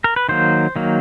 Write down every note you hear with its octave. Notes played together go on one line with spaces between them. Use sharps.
A#4
B4
D#3 F#3 A#3 C5
D#3 F#3 A#3